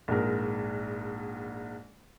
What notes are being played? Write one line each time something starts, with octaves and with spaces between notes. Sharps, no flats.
A#1 G#2 A#4